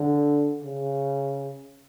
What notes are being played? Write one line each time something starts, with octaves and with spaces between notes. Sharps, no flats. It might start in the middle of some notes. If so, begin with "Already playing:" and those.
Already playing: D3
C#3